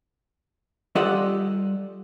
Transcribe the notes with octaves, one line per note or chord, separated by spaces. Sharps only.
G3 F4 G4 A4 D#5 F#5